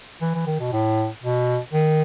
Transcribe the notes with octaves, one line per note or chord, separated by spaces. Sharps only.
E3
E3
D#3
B2
A2
B2
D#3